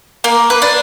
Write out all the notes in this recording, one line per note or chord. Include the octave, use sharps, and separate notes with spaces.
A#3
B4
D4